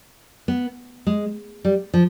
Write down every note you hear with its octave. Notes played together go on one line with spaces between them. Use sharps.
B3
G#3
G3
F3